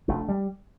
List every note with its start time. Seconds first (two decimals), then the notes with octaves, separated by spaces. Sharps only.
0.08 F1 A3 D4
0.29 G3